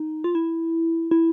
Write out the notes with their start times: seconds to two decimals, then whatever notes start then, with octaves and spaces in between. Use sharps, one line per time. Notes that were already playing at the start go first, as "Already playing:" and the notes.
Already playing: D#4
0.24 F4
0.35 E4
1.11 E4